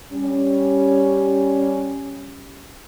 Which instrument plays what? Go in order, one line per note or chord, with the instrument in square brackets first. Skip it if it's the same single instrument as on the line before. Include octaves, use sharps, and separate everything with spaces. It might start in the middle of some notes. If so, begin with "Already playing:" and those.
[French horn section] G3 C#4